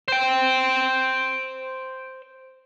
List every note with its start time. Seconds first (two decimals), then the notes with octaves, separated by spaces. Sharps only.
0.08 C5 G5